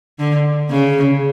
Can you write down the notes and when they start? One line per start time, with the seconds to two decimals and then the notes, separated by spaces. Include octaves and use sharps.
0.19 D3
0.71 C#3